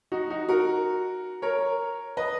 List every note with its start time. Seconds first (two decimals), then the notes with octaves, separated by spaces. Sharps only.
0.12 D#4 F#4
0.30 D#4 F#4
0.49 F#4 A#4
1.42 A#4 C#5
2.17 B4 D#5